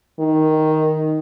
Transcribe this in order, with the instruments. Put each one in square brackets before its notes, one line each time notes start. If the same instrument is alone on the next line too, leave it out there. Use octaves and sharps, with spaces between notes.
[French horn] D#3